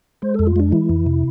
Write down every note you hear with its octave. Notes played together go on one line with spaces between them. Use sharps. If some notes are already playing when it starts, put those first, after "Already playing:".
G#3 C5
F2 A4
F4
G#3 D4
E3 E4
F2
C3